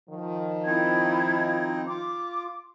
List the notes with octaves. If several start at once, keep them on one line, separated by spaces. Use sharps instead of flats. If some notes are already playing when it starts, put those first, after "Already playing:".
D#3 F3
C4 D#4 E4 G#6
F4 D6